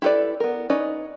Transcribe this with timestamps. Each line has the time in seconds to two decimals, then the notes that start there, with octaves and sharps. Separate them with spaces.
0.02 E4 G4 A4 B4 D5
0.40 B3 A#4
0.70 C#4 D#4 B4 D5